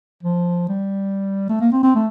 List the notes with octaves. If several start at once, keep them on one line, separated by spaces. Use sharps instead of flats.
F3
G3
A3
A#3
C4
C4
A3